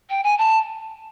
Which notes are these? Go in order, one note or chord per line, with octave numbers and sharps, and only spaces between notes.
G5
G#5
A5